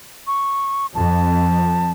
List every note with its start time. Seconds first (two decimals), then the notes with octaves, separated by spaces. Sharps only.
0.27 C#6
0.95 F2 A5